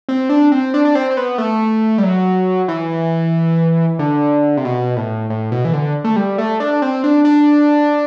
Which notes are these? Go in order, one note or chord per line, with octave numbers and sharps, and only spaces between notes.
C4
D4
C4
D4
D4
C4
C4
B3
A3
G3
F#3
E3
D3
C3
B2
A2
A2
B2
E3
D3
A3
G3
A3
D4
C4
D4
D4